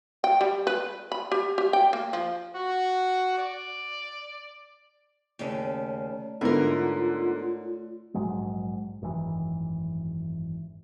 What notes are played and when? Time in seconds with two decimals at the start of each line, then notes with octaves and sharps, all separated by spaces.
0.24 G5
0.41 G3
0.67 B4
1.12 B5
1.32 G4
1.58 G4
1.73 G5
1.93 A#3
2.13 F3
2.55 F#4
3.38 D5
5.39 D#2 C#3 A3 C#5 D5
6.41 G#2 D3 B3 E4 F4 A#4
8.14 A#1 G#2 F#3 G#3
9.01 G#1 F#2 D#3 E3